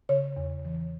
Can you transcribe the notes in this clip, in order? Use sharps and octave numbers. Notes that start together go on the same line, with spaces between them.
C#3 C#5
E2
E3